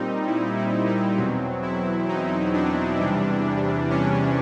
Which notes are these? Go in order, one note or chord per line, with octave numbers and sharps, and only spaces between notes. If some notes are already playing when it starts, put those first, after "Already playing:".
Already playing: A#2 G3 C4 D#4
E4
E4
D#4
E2 B2 F#3 C4
E4
D#4
D4
E2 C3 E3 G3
C#4